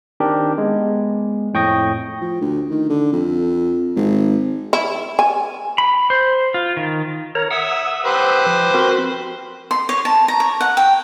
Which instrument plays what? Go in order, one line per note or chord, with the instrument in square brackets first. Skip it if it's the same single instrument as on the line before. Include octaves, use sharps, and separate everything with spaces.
[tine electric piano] D#3 C4 D4 G4 A#4
G#3 B3
F2 A2 G5 C#6 D#6 A#6
[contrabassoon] F3
D2
D#3
D3
F2
G#1
[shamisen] E4
G#5
[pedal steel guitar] B5
C5
F4
D#3
[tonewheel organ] A#4 C#5 A#5
[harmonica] E5 [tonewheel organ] F#5 D#6 E6
[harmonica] G4 B4 C5
[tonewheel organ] F3
C4 F#4 A#4
[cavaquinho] C6
C#5
A5
A#5
C#5
F#5
G5